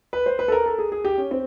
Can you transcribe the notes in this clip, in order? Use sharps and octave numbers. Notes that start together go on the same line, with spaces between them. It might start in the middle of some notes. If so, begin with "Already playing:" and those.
B4
C5
B4
A4
A#4
A4
G#4
G#4
G4
C#4
C4